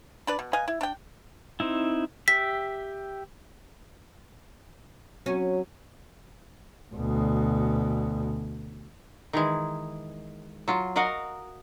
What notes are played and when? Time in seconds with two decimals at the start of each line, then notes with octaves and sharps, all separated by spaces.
0.27 D4 B4 D5
0.39 B2
0.53 B4 D#5 F5 G#5
0.68 E4
0.81 D4 G5
1.60 C4 D#4 E4
2.28 G4 E5 B6
5.26 F#3 C#4
6.95 D2 B2
9.33 D#3 E3 G#3
10.68 F#3 F4
10.96 F#4 A#4 D#5 F5 F#5